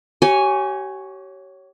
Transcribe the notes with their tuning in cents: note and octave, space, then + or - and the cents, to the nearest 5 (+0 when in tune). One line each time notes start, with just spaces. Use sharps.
G4 -40 C#5 +0 G#5 +0